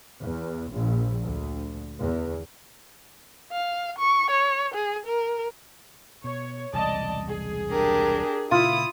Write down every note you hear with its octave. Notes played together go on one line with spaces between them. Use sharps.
E2
A#1
D2
E2
F5
C#6
C#5
G#4
A#4
B2 C#5
E1 C2 D5 D#5 A5
G#4
D4 G4 A#4
A#2 C#3 E4 F4 D#6